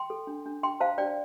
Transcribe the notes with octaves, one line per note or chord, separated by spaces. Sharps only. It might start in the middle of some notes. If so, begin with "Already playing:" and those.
Already playing: G5 C6
A4
D4
D4
D4 G5 C6
C5 F5 A5
D4 D5 G5